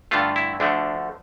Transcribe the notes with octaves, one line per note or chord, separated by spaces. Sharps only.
G2 D3 A3 F4
E4
D2 D3 F3 A3 D4